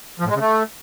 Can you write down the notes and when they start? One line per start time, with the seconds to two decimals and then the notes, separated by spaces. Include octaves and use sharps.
0.19 F3
0.25 A2
0.30 G#3
0.35 C#3
0.40 A3